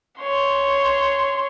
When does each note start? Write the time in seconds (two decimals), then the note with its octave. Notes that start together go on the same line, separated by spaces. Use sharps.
0.19 C#5 C6